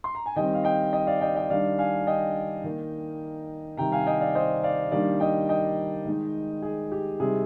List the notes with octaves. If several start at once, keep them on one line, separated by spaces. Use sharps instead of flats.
C6
A#5
G#5
D#3 G3 C4 D#5 G5
F5
D#5 G5
D#5 G5
D5 F5
D#5 G5
D#5 G5
D#3 G3 D4 D5 F5
F5 G#5
D#5 G5
D#3 A#3 D#4
C3 D#3 G3 G5 A#5
F5 G#5
D#5 G5
D5 F5
C5 D#5
D5 F5
D#3 G3 A#3 D4 D5 F5
D#5 G5
D#5 G5
D#3 G#3 D#4
G#4
G4
C3 G3 C4 D#4 G#4